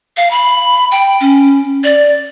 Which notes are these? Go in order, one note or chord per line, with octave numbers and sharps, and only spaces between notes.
F5
B5
G5
C#4
D5